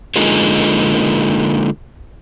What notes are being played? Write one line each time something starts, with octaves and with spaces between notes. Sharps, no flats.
D3 G#3 A#3 D#4 F4 G#4